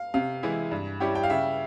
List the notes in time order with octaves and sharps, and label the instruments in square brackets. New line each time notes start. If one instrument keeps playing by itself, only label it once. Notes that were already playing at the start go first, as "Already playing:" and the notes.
Already playing: [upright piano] F5
[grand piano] C3 [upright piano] F5
[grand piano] E3 G#3 E4
G2
G3 C#4 E4 G4
[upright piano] G5
F5
[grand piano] C#3 [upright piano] E5